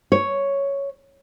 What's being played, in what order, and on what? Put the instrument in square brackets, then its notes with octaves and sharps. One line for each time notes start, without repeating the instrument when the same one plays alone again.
[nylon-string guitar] C#5